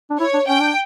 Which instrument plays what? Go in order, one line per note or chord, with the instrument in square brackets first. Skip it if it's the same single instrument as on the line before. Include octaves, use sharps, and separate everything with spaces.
[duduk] D4
[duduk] E4 [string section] C#5
[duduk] D4
[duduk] C#4 [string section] G5
[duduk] D4